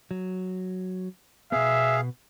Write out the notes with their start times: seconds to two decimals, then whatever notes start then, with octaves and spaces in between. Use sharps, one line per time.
0.11 F#3
1.52 B2 B3 G#4 E5 F5